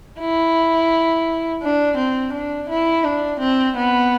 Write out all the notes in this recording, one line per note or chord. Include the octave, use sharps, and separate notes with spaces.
E4
D4
C4
D4
E4
D4
C4
B3